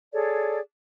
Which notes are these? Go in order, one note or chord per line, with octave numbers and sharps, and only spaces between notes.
G#4 A4 C#5 D5